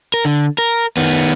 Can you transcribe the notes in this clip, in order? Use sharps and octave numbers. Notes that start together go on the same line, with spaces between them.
A#4
D3
A#4
D#3 B3